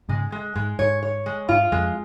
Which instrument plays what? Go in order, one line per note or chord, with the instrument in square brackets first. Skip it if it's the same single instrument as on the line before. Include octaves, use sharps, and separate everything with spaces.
[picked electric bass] G#2 C#3 [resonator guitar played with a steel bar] G#3
[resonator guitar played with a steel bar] G#3
[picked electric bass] G#2 [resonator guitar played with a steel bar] G#3
[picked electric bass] G#2 [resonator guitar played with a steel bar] C#5
[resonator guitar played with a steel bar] C#5
G#3
[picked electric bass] G#2 [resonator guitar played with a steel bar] F4
[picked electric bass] F2 [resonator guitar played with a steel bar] G#3